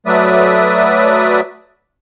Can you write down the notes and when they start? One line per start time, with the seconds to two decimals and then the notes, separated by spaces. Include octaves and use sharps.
0.06 F#3 A3 B4 D5 E5 D#6